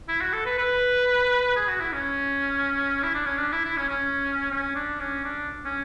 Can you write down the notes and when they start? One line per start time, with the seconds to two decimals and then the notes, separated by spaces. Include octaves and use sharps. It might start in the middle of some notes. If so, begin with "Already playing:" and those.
0.08 E4
0.22 F#4
0.33 A4
0.46 B4
0.58 B4
1.56 G#4
1.68 F#4
1.81 E4
1.93 C#4
3.03 E4
3.14 D4
3.26 C#4
3.38 D4
3.53 E4
3.65 E4
3.77 C#4
3.90 C#4
4.51 C#4
4.75 D4
5.00 C#4
5.24 D4
5.65 C#4